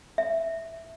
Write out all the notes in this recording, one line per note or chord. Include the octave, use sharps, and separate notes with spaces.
E5